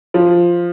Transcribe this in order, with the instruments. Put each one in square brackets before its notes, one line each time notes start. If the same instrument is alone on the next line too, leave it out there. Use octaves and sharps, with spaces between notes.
[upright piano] F3